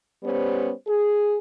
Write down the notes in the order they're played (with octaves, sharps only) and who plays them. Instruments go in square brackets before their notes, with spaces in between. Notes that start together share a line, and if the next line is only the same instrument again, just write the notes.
[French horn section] G3 B3 C#4 G4 C5
G#4